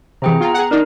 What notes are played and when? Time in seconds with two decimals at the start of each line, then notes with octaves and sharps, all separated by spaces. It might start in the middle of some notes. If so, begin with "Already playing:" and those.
0.22 C3 E3 G#4 G5 A#5
0.41 B3 F4 A#5
0.54 G#4 F#5
0.71 D4 D#4 A#4